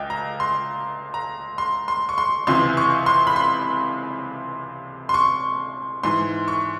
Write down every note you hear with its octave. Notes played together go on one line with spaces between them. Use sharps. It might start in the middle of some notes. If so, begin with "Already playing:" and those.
Already playing: C#2 D#5 G5
A#5
C6
A#5
C6
C6
C#6
C6
C#2 C3 E3 C6
C#6
C6
B5
C6
C6
C#6
G#2 E3 C6
C#6